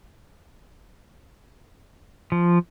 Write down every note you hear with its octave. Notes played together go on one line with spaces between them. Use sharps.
F3